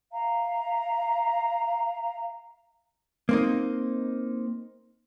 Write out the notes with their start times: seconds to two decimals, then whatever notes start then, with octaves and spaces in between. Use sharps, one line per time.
0.11 E5 F5 A#5
3.29 A#3 C4 D#4